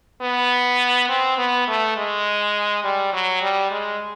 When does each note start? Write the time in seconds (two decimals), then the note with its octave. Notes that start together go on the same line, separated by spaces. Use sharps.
0.21 B3
1.09 C4
1.38 B3
1.68 A3
1.97 G#3
2.84 G3
3.13 F#3
3.42 G3
3.71 G#3